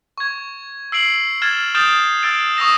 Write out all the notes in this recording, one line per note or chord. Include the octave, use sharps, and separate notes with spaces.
C#6 G#6
E6 C7 D7 F#7
F6 G#6 A6 E7
D#6 F6 G6 A6 D7 E7
E6 F6 A6 D7
C#6 D#6 E6 A#6 E7